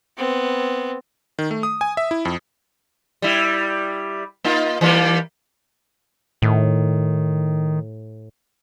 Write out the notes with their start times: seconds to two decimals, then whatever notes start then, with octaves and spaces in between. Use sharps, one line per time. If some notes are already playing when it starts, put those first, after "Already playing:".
0.17 B3 C4
1.39 D#3
1.51 A3
1.63 D#6
1.81 G#5
1.97 E5
2.11 E4
2.25 F2
3.22 G3 E4
4.44 A#3 D#4 F4
4.81 E3 G3 A#3
6.42 A2 D#3